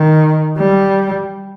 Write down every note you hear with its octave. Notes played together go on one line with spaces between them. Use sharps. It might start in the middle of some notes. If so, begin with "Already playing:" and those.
Already playing: D#3
G3